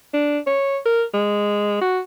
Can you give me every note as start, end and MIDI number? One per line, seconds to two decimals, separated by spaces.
0.14 0.39 62
0.47 0.78 73
0.86 1.04 70
1.14 1.80 56
1.81 2.00 66